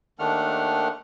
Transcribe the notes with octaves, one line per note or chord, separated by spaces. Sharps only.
D#2 D#3 A3 D4 F#5 F6